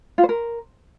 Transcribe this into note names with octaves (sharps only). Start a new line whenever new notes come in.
F4
C5
A#4